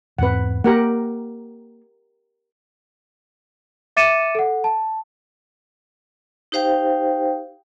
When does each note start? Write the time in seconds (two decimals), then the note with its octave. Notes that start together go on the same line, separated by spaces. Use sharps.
0.18 E2 G#2 C4 B4 F#5
0.64 A#3 G4 A#4 F#5
3.97 E5 D6 A6 C#7 D#7 E7
4.35 A4 F#5
4.64 A5
6.52 D#4 G4 C5 F5 G5